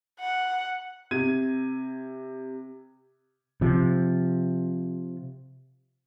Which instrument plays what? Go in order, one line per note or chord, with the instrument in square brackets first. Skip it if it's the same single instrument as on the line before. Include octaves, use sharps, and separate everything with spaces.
[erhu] F#5
[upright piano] C3 G#6 D#7
[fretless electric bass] C3 F3